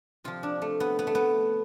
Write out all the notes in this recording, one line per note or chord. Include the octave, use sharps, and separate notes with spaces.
C3 F3 F4
D4
A3
B3
B3
A3
B3